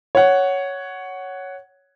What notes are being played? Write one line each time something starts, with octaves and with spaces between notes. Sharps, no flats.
C#5 F#5